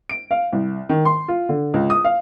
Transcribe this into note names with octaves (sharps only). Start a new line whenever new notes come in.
D7
F5
C2
D#3
C6
F4
D3
C#2
D#6
F5